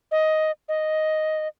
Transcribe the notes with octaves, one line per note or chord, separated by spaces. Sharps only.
D#5
D#5